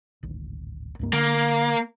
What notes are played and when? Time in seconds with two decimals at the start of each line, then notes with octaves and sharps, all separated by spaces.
0.23 D1 G#1
0.99 C#2 G2 A#3
1.13 D3 A#3